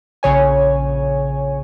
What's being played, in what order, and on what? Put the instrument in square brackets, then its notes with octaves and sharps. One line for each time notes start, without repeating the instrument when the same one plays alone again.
[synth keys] A#1 C#3 C#5 G#5